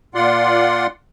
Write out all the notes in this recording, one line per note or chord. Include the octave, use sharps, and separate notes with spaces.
A#2 F4 D5 F#5 C6